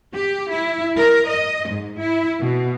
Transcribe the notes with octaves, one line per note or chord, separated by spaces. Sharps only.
G4
E4
A#4
D#5
G#2
E4
B2